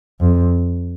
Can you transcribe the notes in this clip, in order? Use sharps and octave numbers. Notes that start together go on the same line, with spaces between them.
F2